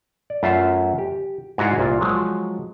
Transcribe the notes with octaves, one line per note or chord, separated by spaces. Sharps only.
D5
F#2 A3 F4 E5 F5
G4
G#2 E4 F#4 G#4 D5 F5
C2 A#2 F4
F3 F#3 G#3